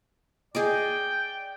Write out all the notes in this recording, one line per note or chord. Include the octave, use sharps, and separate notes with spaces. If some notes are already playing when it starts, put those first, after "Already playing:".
G#4 D5 D#5 G5 D6